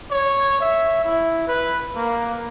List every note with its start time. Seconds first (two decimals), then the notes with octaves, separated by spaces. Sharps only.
0.11 C#5
0.60 E5
1.04 E4
1.48 B4
1.95 A#3